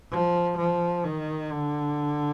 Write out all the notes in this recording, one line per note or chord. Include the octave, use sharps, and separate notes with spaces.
F3
F3
D#3
D3